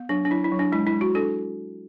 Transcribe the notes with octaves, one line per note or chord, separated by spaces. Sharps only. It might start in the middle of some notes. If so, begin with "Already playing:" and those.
Already playing: B3
F#3 D4
D4
F#3 E4
E4
F#3
D4
G#3 E4
E4
G#3
F#4
D4 A4